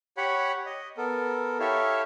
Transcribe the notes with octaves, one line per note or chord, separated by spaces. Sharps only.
G4 C#5 F#5 B5
D#5
B3 A4 A#4
E4 G4 A4 C#5 E5 F5